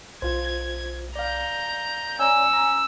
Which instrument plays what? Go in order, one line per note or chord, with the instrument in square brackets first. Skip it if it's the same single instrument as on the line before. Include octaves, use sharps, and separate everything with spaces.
[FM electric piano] B1 [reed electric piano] F4 C5 [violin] G#6
[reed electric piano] D5 F5 [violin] A#5 G6
[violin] C#4 [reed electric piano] C#5 D5 A#5 [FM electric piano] G#5 [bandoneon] E6
[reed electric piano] A#5